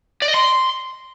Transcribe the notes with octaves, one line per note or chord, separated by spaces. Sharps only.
D5
D#5
C6